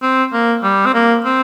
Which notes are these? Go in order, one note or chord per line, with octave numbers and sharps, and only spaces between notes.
C4
A#3
G3
C4
A#3
C4